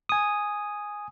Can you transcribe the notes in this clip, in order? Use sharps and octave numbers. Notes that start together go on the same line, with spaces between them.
G#5 D#6